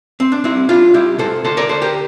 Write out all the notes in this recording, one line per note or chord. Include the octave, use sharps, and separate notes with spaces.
C4
D4
C2 C4 E4
C2 D4 F4
C2 E4 G4
C3 A4 C5
D2 A4 C5
A#4 D5
D2 A4 C5
G4 A#4